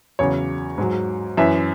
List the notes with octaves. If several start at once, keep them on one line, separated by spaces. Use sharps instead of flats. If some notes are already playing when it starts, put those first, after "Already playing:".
E2 C#3 F#3 C#5
G#2 F#3
F#2 E3 E5